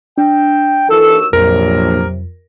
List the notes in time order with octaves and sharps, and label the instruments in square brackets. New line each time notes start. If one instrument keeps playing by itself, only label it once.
[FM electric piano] D4 [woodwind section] G5
[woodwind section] D#2 F#4 E6 [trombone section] E3 A4
[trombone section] A#1 [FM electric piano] F2 [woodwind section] C3 F#3 [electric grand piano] A#4